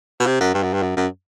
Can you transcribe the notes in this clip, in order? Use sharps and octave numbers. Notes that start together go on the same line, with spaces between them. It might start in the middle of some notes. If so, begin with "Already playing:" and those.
B2
C3
F#2
G2
F#2
G2
F#2
F#2